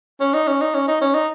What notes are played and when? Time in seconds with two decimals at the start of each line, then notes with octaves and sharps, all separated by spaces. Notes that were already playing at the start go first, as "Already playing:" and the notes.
0.20 C#4
0.34 D#4
0.47 C#4
0.61 D#4
0.74 C#4
0.88 D#4
1.01 C#4
1.14 D#4